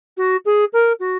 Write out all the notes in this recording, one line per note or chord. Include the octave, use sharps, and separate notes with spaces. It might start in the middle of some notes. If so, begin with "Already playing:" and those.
F#4
G#4
A#4
F#4